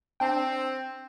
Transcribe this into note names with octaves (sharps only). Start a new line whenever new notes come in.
C4 D4 G5